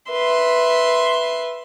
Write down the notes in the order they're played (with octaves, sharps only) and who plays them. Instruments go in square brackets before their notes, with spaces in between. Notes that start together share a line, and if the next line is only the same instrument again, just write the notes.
[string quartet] B4 E5 C6